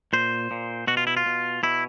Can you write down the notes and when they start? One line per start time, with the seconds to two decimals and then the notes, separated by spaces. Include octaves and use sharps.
0.13 A#2 C5
0.51 A#2
0.87 B2 F#4
0.97 F4
1.07 E4
1.17 F4
1.26 B2
1.63 B2 E4